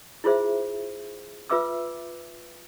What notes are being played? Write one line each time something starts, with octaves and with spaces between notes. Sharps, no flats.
E4 F4 G#4 C5 E5
F4 B4 E5 D6 E6